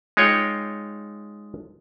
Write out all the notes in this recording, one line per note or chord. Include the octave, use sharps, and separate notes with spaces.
G#3 D#4 F4 C#5 G5